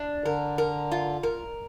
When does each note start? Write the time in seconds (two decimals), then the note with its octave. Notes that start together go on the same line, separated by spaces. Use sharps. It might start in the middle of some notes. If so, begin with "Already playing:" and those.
Already playing: D4
0.25 D3 A#4
0.58 A#4
0.92 F4
1.23 A#4